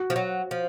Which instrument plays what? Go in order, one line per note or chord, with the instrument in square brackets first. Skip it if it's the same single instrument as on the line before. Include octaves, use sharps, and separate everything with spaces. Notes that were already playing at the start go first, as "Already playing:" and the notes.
Already playing: [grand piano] F#4
[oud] F3
F#3
F3